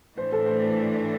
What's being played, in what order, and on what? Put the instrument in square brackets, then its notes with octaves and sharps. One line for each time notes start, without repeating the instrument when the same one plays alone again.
[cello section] A2 E3 A3 D4 [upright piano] C5
[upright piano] A4
C5